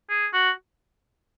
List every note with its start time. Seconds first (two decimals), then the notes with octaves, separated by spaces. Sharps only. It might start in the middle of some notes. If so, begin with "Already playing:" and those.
0.10 G#4
0.34 F#4